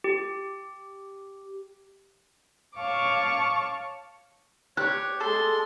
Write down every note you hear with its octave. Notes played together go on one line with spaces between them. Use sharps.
G4
C#5 F5 A5 C#6 D6
G4 C#5 F#6
G#3 A4 C6